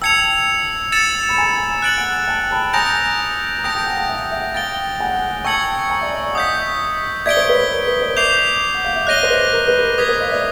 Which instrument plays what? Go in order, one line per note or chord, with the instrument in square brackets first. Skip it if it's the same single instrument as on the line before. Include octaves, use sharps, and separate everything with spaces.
[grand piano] G5 A5 [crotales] E6 G#6 C#7 F7
[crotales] E6 A6 C#7 E7
[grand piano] B5
G#5 A#5
[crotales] F#6 A6 D7 F#7
[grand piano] F#5 G#5
G5 A5
A5 B5
[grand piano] G#5 A#5 [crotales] D#6 G6 A#6 D7 F7
[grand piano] A#5
[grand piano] G5 A5 [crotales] D#6 G6 A#6 D7
[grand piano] G5 A5
F#5 G#5
F5 G5
E5 F#5
E5 F#5
[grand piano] F5 G5 [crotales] A6 D7 G7
[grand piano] F#5 G#5
[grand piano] G5 A5 [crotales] C#6 E6 G#6 C#7 F#7
[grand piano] G#5 A#5
D5 E5
C#5 D#5
D5 E5
F#5
[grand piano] D#5 F5 [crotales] D#6 G6 B6
[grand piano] D5 E5 [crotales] G#6 B6 D7 G7
[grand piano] C5 D5
B4 C#5
A#4
B4
C5 D5
[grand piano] D5 E5 [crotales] D6 G6 C7 F7
[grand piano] F#5
F5
E5
[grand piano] C#5 D#5 [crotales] F#6 A#6 D#7 G7
[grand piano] C5
B4
A#4
B4
A#4
[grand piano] B4 [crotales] D#6 G#6 B6
[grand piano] A#4 C5
D#5 F5
D5 E5